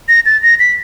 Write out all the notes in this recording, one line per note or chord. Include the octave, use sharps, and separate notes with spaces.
A#6
A6
A#6
B6